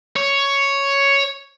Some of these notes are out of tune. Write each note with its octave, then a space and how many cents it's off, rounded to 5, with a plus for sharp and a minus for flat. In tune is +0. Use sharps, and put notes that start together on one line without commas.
C#5 +5